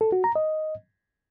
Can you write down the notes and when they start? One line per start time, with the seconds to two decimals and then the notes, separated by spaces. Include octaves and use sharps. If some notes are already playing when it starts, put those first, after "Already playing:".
0.01 A4
0.12 F#4
0.24 A#5
0.36 D#5